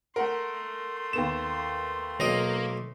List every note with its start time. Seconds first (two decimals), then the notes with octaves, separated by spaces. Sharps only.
0.16 A3 A#4 F#5 C6
1.13 D#2 B3 E7
2.20 B1 A#3 D#5